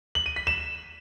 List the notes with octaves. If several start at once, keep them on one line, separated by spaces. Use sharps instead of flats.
F#7
D#7
B6
E7